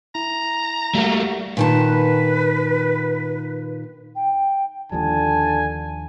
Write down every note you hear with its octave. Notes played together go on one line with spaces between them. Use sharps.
E4 A#5
G3 A3 A#3 F#4
A#2 D#3 B4 A5
G5
D#2 D3 F3 G3 G#5 A5